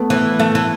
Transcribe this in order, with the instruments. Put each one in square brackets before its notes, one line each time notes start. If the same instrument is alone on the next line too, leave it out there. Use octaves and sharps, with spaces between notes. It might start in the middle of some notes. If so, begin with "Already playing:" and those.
Already playing: [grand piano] A3 B3
[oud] E3
A3
E3